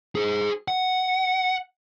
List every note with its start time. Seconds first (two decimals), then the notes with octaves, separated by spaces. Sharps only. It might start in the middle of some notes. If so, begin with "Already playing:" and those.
0.15 G#4 C5
0.68 F#5